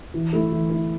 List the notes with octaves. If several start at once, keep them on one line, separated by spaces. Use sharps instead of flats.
E3
A3 E4
E3
A3 E4